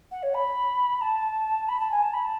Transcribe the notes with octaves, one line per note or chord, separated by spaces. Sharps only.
F#5
C#5
B5
A5
B5
A5
G#5
A5
B5
A5